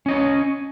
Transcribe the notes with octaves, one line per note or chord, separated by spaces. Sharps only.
C#4 C#5 D#5